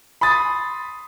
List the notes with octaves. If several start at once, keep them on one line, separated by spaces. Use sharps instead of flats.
B5 C6 D#6 A6